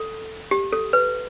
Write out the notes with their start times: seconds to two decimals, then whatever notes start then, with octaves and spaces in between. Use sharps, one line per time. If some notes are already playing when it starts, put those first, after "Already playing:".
Already playing: A4
0.51 G4
0.73 A4
0.93 B4